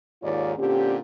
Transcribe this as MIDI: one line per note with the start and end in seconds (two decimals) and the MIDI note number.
0.23 0.53 39
0.23 0.53 44
0.23 0.53 51
0.23 0.53 65
0.23 0.53 73
0.23 0.53 74
0.58 0.98 46
0.58 0.98 50
0.58 0.98 60
0.58 0.98 61
0.58 0.98 67